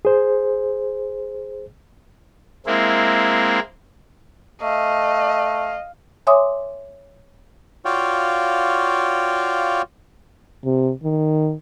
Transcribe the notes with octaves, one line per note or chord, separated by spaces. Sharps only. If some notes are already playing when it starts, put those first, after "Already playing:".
G#4 C5
G#3 A#3 C4 E4
A3 D#5 F5
C#5 E5 G#5 C6 D6 D#6
F4 F#4 C#5 D5 F5 G5
C3
D#3